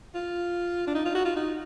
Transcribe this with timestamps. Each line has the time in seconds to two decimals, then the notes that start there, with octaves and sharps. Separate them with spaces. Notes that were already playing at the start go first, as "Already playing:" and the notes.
0.15 F4
0.87 D4
0.95 D#4
1.05 F4
1.15 F#4
1.25 F4
1.36 D#4